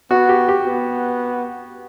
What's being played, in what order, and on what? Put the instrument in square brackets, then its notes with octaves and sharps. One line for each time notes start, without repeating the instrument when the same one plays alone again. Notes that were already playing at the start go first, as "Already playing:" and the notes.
[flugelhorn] B3 [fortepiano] F#4
[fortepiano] G4
G4
[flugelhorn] B3